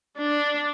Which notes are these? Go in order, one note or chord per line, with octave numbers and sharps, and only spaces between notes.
D4